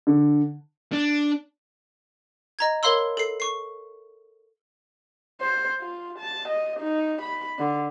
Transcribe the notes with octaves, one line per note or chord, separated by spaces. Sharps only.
D3
D4
D#5 A#5 G#6
A#4 C#5 F5 B5 C6 E6
A4 C7
C#6 C7
C5
F4
A5
D#5
D#4
B5
D3